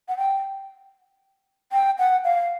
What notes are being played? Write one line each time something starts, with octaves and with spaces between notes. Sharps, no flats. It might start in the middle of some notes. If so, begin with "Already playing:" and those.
F#5
G5
G5
F#5
F5